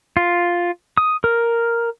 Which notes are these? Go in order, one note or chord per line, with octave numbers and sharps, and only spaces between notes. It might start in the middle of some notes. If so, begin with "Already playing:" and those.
F4
D#6
A#4